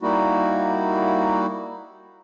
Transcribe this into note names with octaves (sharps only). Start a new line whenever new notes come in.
G3 A#3 D#4 E4 F#4